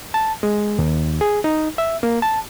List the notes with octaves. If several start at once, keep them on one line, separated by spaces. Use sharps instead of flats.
A5
G#3
D#2
G#4
D#4
E5
A#3
A5